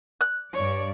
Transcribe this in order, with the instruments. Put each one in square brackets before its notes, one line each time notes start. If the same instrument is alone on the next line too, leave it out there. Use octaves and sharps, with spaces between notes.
[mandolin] F#6
[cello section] G2 D5 [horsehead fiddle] C#5